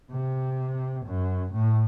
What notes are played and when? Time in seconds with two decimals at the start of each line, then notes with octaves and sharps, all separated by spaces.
0.11 C3
1.06 F#2
1.53 A2